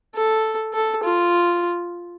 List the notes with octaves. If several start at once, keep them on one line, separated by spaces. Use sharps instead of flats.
A4
A4
F4